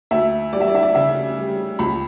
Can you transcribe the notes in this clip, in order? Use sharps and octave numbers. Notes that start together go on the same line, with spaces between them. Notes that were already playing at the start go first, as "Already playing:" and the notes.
D2 E5
G3 D5
E5
D5
E5
D5
C#3 E5
G3
C#2 B5